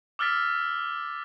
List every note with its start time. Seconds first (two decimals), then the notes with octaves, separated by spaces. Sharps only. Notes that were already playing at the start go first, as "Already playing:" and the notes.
0.19 D6 E6 F6 A6 B6